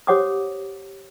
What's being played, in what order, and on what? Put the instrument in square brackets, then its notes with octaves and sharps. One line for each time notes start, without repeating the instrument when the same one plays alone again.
[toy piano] G4 C5 C#5 F#5 D6 D#6